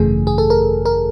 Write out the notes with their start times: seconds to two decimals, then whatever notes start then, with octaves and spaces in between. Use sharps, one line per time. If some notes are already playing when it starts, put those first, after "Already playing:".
Already playing: G#1 F#2 C#3 E3 A3 G#4
0.27 G#4
0.38 A4
0.50 A#4
0.86 A#4